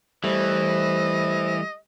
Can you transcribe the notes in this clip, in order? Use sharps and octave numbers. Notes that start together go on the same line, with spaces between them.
E3 G3 A3 C5 D#5